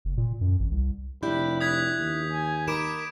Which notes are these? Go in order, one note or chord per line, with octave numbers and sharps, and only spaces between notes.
F1
A#2
F#2
A1
C2
F1 D4 E4 G4 B5 G6
D#6 F#6 G#6 B6
D#2
G#5
D#4 A#4 B5 D6 D7 E7